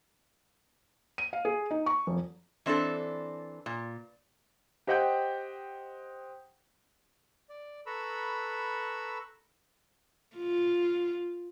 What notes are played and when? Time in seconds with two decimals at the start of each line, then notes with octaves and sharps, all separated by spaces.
1.18 D#7
1.33 F5
1.45 G#4
1.71 D#4
1.86 C#6
2.07 F1
2.66 E3 C4 D4 A4
3.66 A#2
4.87 G4 C5 D#5 F#5 G5 G6
7.49 D5
7.86 A4 B4 A#5 B5 C#6 E6
10.37 F4